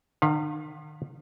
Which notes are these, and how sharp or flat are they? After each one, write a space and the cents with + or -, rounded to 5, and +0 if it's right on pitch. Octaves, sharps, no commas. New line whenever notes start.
D#3 -40 B4 +0 F5 +25